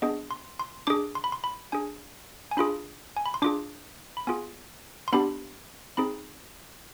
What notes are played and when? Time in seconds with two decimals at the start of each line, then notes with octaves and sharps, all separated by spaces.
0.02 B3 D4 G#4 D#5
0.31 C6
0.59 C6
0.87 D4 G#4 D6
1.15 C6
1.24 B5
1.32 C6
1.44 B5
1.72 D4 G#4 G#5
2.51 G#5
2.57 D4 F4 G#4 B5
3.17 G#5
3.26 B5
3.34 C6
3.42 D4 F4 G#4 D6
4.17 B5
4.27 B3 F4 G#4 G#5
5.08 C6
5.13 B3 D4 G4 B5
5.97 C4 D#4 G#4 B5